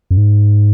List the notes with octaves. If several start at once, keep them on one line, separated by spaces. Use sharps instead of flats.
F#2
G#2